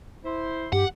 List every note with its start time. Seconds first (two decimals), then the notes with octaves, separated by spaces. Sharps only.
0.25 E4 C5 C6
0.72 G2 G4 F#5